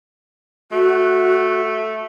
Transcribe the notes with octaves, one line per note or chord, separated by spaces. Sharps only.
A3 F#4